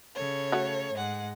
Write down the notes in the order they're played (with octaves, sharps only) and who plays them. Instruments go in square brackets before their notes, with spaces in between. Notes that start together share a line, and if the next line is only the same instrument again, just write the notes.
[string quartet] C#3 A4 C#5
[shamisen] A3 F#4
[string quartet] G#2 G#3 F#5